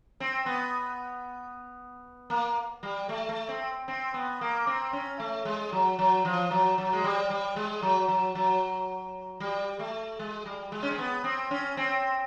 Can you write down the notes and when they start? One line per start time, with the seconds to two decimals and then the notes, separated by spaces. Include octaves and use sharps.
0.20 C4
0.46 B3
2.30 A#3
2.83 G3
3.09 A3
3.29 A3
3.49 C4
3.88 C4
4.14 B3
4.41 A#3
4.67 C4
4.93 C#4
5.19 A3
5.45 G#3
5.72 F#3
5.99 F#3
6.25 F3
6.51 F#3
6.78 F#3
6.93 G#3
7.04 G3
7.30 G3
7.56 G#3
7.82 F#3
8.08 F#3
8.35 F#3
9.40 G3
9.79 A3
10.19 G#3
10.46 G3
10.72 G#3
10.83 C#4
10.91 C4
10.99 B3
11.24 C4
11.51 C#4
11.77 C4